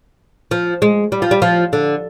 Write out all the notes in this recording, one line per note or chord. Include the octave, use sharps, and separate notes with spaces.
F3
G#3
G3
F3
G3
F3
D3